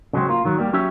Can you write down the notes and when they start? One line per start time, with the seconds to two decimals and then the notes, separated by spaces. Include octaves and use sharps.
0.13 C#3 F#3 G#3 C4
0.29 A#3 F4
0.45 D#3 F#3
0.58 G3 A#3 G4
0.73 F#3 C#4 G4 E5